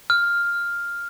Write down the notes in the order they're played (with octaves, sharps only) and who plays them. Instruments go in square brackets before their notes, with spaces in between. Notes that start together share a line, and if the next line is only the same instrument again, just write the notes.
[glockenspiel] F6